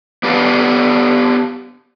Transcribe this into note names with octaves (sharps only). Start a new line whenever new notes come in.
B3 D4 G4 B4 D5 F5